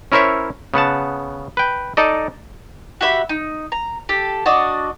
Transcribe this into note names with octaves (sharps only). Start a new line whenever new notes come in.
C#4 E4 A#4 C5 C#5 E5
C#3 B3 F#5 A5
B4 G5
D#4 A4 D5 D#5
F#4 G4 E5 B5
D#4
A#5
G4 A4
D4 F#4 D5 D#5